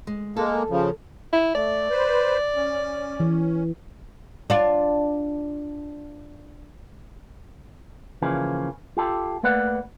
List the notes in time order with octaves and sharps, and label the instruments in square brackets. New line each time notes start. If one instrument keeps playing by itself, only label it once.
[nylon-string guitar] G#3
[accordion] G#3 A#3 [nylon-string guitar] A4
[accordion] C#3 F3
[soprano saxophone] E4
[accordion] A3 [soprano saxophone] D5
[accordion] B4 C5
C#4
[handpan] E3
[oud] D4 F4
[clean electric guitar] C#3 E3 F3 A#3 C#4
F4 G4 A4
A3 A#3 B4 D5 F#5